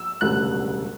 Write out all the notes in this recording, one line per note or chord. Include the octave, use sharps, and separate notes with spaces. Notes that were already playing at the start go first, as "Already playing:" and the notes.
Already playing: E6
E1 D2 C#3 G3 F#6